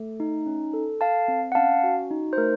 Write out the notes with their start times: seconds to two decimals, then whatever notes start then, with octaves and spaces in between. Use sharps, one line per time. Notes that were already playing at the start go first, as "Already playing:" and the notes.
Already playing: A3 A4
0.20 D#4
0.46 C#4
0.73 A4
1.01 A4 F5 A5
1.28 C4
1.52 F#5
1.55 C#4 F5 A5
1.84 F#4
2.11 D#4
2.33 C5
2.38 A3 A#4